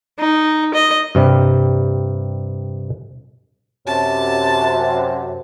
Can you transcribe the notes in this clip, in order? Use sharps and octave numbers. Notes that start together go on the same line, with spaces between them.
D#4
D#5
G2 C3 G3
F#2 C3 A5